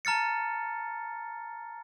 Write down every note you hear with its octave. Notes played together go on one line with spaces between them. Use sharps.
A5 A#5 F6 A6 C#7